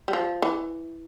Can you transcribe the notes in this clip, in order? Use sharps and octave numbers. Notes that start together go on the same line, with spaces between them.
G3
F3
E3